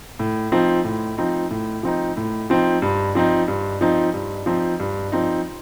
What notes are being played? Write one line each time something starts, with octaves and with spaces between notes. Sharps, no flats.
A2
F3 C4 D#4
A2
F3 C4 D#4
A2
F3 C4 D#4
A2
F3 C4 D#4
G2
F3 C4 D#4
G2
F3 C4 D#4
G2
F3 C4 D#4
G2
F3 C4 D#4